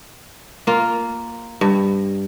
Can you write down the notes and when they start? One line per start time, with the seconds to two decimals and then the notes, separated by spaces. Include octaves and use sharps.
0.67 A#3 F4
1.61 G2